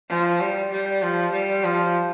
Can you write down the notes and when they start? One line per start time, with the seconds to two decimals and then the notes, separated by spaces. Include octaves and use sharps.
0.09 F3
0.40 G3
0.71 G3
1.02 F3
1.33 G3
1.64 F3